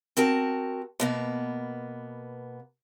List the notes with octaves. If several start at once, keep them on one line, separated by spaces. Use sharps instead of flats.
C4 F#4 A#4 A5
B2 A#3 B3